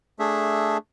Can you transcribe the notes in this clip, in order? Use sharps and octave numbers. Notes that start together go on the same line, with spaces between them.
A3 D4 G#4 E5